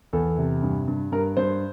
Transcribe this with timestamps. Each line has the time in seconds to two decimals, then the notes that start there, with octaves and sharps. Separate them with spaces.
0.13 E2 A4
0.38 C3
0.63 G2
0.88 G2
1.12 G2 A#4
1.37 G2 C5